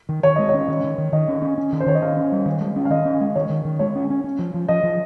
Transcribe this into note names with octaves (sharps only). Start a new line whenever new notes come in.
D#3
D#3 C#5
G#3 D#5
C#5
C#4
D#3
D#3
D#3
D#3 D#5
C#4
C#4
C#4
D#3
C5
D#3 C#5
D#5
C#4 F5
C#4
G3
D#3
G#3
C#4
F5
D#3 D#5
C#4
G#3
D#3 C#5
D#3
D#3
G#3 C#5
C#4
C#4
C#4
F3
F3
F3 D#5
F3